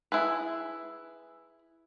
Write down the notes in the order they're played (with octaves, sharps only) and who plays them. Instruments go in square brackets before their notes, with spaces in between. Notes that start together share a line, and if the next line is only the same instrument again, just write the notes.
[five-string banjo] E4 G#4 B4